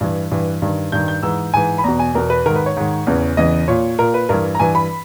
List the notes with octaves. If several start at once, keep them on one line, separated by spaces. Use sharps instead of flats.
G2 E3
G2 E3
G2 D#3
G2 D#3 G6
G6
G#2 E3 E6
G#2 E3 G#5
B5
E2 B2 A#5
G#5
E2 B2 A#4
B4
G#2 D#3 A#4
B4
C#5
G#2 D#3
E2 C#3 E3
E2 C#3 E3 D#5
A#2 C#5
A#2 A#4
B4
G2 E3 A#4
A#5
G2 E3 G#5
B5